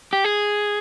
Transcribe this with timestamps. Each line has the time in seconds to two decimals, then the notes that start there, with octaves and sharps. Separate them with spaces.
0.13 G4
0.24 G#4